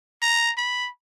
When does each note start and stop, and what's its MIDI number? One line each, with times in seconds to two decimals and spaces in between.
0.22 0.51 82
0.58 0.89 83